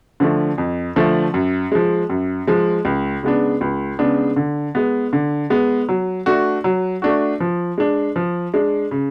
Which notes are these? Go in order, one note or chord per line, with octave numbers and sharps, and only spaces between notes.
D3 F3 A3
F2
D3 F3 A3
F#2
F3 G#3
F#2
F3 G#3
C#2
C#3 G#3 B3 D4
C#2
C#3 G#3 B3 D4
D3
G#3 B3
D3
G#3 B3
F#3
A3 D4 F#4
F#3
A3 D4 F#4
F3
G#3 D4
F3
G#3 D4
C#3